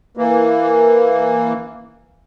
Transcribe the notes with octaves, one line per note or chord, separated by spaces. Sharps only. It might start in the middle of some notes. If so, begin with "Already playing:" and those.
E3 A#3